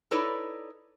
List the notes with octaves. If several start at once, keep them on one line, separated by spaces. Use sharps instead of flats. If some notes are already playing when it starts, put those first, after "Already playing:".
D#4 E4 A4 B4 C#5 D5